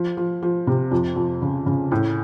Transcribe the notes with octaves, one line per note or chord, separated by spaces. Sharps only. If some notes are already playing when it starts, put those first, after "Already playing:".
Already playing: F3
F3
F3
C3
F2
F2
C#3
C#3
A2